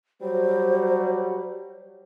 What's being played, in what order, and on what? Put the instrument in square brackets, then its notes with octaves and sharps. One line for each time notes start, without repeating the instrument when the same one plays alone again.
[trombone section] F#3 G3 [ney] C5